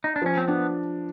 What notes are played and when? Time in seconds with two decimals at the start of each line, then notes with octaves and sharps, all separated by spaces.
0.04 D#4
0.16 D4
0.22 F3 C#4
0.37 C4
0.48 B3 D4